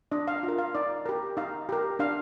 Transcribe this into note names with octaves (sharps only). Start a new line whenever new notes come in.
D4 D#5
F5
F4
A#4
F5
D#4 D5
G4 A#4
D#4 F5
G4 A#4
D4 F5